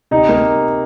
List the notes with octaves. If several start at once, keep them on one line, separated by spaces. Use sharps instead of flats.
C3 D#4
A#3